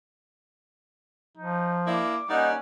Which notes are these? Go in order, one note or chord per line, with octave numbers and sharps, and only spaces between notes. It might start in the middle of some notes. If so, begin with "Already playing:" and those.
F3 D#4
A#3 D4 E4 D6
G3 A#3 C#4 D#4 D5 F#5